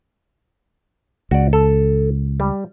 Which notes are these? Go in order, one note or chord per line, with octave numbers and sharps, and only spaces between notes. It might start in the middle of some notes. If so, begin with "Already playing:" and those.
C#2 F#4 D5
A4
G3